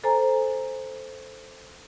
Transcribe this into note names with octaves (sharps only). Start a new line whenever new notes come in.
A4 C5 G#5 A#5